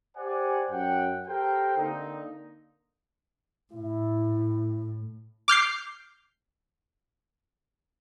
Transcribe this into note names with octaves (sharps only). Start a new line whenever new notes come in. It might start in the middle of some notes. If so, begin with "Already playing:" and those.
G4 C5 D5 F#5 G#5
F#2 F#5 G5
G4 A4 A#4 C5 G5
D3 A#3 C4 D#4
A2 E4
D6 F6 G6 C7